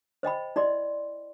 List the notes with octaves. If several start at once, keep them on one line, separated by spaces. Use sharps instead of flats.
C5 D#5 G5 B5
E4 D5 D#5 C6